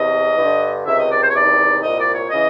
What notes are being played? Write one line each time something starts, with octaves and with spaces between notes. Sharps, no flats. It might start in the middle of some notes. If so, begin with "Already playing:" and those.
Already playing: E2 C3 E3 D#5
G2 D3
C#2 C3 D#3 E5
D#5
D5
C5
C#5
E2 C3 D#3 D5
C2 A#2 D#5
D5
C#5
C#3 E3 D#5